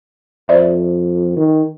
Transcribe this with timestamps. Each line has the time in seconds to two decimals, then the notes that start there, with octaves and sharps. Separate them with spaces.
0.49 F2 C5 D5 E5
1.37 D#3